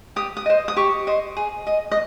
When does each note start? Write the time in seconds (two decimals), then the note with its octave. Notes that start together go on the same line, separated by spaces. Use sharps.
0.16 G4 D#6
0.37 D#6
0.46 C5 D#5
0.68 D#6
0.76 G4 C#6
1.07 C5 D#5
1.37 G#4
1.67 D#5
1.91 D#5